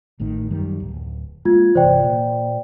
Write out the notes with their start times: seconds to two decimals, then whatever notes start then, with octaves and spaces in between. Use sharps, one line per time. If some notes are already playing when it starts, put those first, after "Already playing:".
0.20 A1 A2 D#3
0.50 F#2 D#3 G3
0.80 D1
1.45 G#3 A#3 F4 G#6
1.75 G1 C3 E3 C5 D5 G5
2.04 A#2